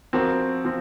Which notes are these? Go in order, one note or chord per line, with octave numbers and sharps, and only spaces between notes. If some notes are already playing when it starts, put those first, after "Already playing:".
F3 C4 F#4 A#4
F3 C4